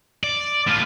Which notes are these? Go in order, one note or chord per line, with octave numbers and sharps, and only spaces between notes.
D5
A2 F4